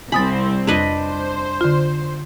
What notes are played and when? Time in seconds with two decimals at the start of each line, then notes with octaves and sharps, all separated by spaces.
0.12 C2 C4 G#5 B5 D#6 A6
0.67 F2 D4 B4 D#5
1.00 C5
1.61 D3 F4